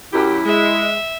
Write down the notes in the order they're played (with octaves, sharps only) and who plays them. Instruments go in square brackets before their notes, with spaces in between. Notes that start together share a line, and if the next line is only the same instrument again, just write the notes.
[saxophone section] F#2 G4 [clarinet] E4
[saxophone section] G#3 [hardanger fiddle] E5